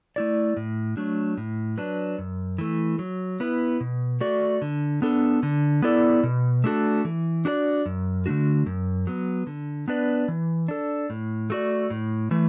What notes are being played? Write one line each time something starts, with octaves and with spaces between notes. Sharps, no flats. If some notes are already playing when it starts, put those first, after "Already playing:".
A3 E4 D5
A2
F#3 A3 D4
A2
F#3 D4 B4
F#2
E3 A3
F#3
B3 E4 B4
B2
A3 F#4 D5
D3
B3 D4 A4
D3
B3 E4 A4 D5
B2
A3 D4 F#4 A4
E3
D4 F#4 A4 D5
F#2
D3 A3 D4 F#4
F#2
F#3 B3
D3
B3 D4 B4 D5
E3
D4 A4
A2
A3 F#4 D5
A2
E3 A3